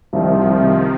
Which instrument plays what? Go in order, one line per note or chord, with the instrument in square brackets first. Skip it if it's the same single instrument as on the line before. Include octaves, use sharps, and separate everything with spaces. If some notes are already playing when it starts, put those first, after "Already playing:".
[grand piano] C2 [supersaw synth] D#3 F3
[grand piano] C3
C2
C3